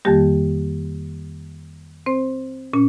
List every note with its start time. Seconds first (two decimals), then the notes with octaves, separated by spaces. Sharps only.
0.05 F2 D#3 G3 A#3 G4
2.06 C4 C5
2.73 A#2 C#4